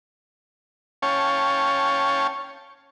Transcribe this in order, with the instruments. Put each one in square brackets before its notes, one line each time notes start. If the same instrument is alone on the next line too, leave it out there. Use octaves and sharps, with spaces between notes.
[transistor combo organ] C#4 C#5 F5 G5 A5